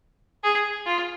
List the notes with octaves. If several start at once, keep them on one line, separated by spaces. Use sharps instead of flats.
G#4
F4